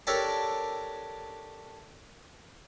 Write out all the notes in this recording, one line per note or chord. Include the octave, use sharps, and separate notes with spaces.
D4 G4 A4 A#4 C#5